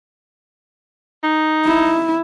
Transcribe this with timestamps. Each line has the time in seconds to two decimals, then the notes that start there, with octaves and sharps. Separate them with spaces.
1.23 D#4
1.65 E4